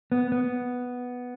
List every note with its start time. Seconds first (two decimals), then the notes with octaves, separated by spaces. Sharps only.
0.12 B3
0.32 B3